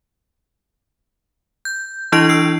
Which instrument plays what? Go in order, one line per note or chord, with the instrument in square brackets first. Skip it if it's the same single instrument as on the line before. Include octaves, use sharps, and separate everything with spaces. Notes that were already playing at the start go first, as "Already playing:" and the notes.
[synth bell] G6
E3 D4 E4 D#5 C#6 D7
E6 C7